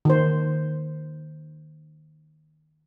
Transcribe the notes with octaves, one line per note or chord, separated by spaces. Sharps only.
D#3 C5